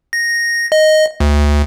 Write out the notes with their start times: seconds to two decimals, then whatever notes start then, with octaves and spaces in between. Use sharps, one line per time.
0.13 A#6
0.72 D#5
1.20 D2